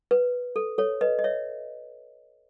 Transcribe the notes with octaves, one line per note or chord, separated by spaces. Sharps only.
B4
A4
A4 C#5
B4 D#5
D#5
C#5 E5